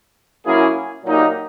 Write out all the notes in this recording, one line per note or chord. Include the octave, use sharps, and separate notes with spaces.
F#3 A#3 C#4 E4 G#4
A#2 F#3 A#3 D#4 G4